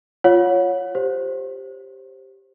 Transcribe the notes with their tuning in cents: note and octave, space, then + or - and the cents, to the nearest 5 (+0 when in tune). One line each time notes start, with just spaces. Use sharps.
F4 +0 C#5 +0 F#5 -35
G4 +0 C5 +0